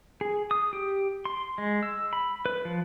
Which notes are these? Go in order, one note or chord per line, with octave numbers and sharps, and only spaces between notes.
G#4
D#6
G4
C6
G#3
E6
B5
B4
F3